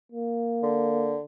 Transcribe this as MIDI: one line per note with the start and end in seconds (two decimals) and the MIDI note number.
0.12 1.16 58
0.63 1.22 50